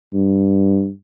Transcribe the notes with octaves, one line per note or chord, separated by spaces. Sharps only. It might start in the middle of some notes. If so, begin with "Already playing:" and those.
G2